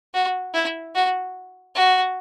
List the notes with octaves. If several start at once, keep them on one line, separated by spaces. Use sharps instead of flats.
F#4
E4
F#4
F#4